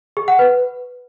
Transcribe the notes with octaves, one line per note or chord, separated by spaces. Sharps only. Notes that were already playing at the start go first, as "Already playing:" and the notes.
G#4
F#5
B4